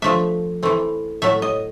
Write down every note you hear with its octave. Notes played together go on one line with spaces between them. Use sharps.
F3 A3 D4 E5
E3 A3 C4
A2 F#3 A3 E5
D#5